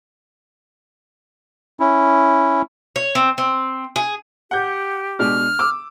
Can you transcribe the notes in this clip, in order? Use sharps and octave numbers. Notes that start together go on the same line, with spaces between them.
C#4 E4
C#5
C4
C4
G#4
G4 F#5 G6
B2 G#3 D4 F6
D6 E6